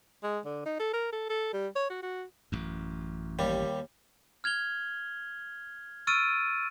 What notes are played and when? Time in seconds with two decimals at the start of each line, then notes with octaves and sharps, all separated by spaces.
0.23 G#3
0.45 D3
0.66 D#4
0.79 A4
0.93 A#4
1.13 A4
1.30 A4
1.53 G3
1.75 C#5
1.90 F#4
2.02 F#4
2.52 A1 F#2
3.39 D#2 G3
4.44 F6 G#6 F7 G7
6.07 C#6 E6 F6 A6 D7 D#7